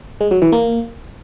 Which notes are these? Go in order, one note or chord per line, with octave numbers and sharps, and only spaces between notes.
G#3
F#3
E3
A#3